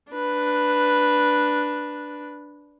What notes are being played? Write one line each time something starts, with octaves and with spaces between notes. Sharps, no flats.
D4 B4